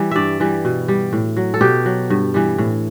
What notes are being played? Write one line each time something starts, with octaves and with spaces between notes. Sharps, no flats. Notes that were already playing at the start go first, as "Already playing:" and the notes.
Already playing: E3 G3
G2 D5 E5
E3 G3
B2
G3
A2
F#3
A4
B2 G4
F#3
G2
E3 G3
A2